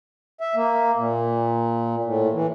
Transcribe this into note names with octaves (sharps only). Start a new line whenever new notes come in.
E5
A#3
A#2
A2
E3